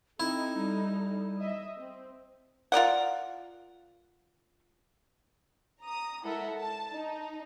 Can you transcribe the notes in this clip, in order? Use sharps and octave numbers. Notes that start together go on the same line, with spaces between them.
C4 D#4 E4 A4
G3
D#5 E5
C4
F4 A#4 D5 F#5
A#5 D#6
G#3 E4 A4 A#4 E5 F#5
A5
D#4